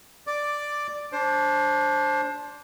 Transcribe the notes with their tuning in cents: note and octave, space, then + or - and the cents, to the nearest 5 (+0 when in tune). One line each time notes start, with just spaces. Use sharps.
D5 +5 D6 +0
D4 -15 C5 +20